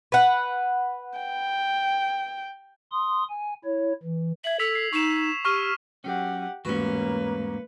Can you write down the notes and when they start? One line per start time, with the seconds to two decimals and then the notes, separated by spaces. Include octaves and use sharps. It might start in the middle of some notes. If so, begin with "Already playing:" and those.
0.12 B4 F#5
1.19 G5
2.92 C6 D#6
3.30 G#5
3.64 E4 C#5
4.03 E3
4.44 E5 G#6 F#7
4.59 A4 E6 B6 F7
4.75 C7
4.93 D#4 C#6 E7
5.45 G4 C#6 F6 D#7
6.04 F#3 C#4 G4 F#5
6.65 A1 E2 G#2 A#3 C#4 F#4 B4